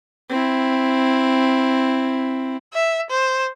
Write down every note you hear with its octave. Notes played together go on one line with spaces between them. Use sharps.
C4 E4
E5
C5